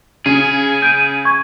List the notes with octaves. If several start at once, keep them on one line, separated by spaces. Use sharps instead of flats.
C#3 G#4
G6 D7 D#7
C#6 G#6